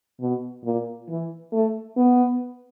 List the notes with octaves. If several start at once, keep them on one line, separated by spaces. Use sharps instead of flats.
B2
A#2
E3
A3
B3